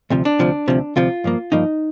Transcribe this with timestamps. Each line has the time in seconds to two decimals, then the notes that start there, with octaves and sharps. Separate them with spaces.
0.10 D2 C3 F3
0.25 D4
0.39 D2 C3 F3
0.68 D2 C3 F3
0.96 D2 C3 F3 F4
1.24 G2 F3 A#3
1.52 G2 F3 A#3 D#4